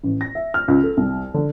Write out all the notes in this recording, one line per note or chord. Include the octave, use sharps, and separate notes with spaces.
A1
A#6
E5
F6
C#2
A4
C2
D3